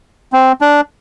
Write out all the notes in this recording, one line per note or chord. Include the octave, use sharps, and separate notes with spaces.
C4
D4